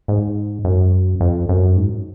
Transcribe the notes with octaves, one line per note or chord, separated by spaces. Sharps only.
G#2
F#2
F2
F#2
G#2